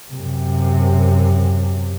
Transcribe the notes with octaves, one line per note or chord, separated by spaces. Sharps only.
F#2 C3